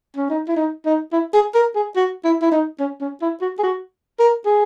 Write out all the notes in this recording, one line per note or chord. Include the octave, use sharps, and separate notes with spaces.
C#4
D#4
E4
D#4
D#4
E4
G#4
A#4
G#4
F#4
E4
E4
D#4
C#4
C#4
E4
F#4
G#4
F#4
A#4
G#4